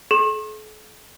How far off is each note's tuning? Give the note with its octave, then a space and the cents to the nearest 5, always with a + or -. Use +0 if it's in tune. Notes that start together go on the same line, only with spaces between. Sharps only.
A4 -45 C6 +45